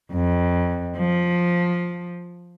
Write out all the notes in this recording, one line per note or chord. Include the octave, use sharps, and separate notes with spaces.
F2
F3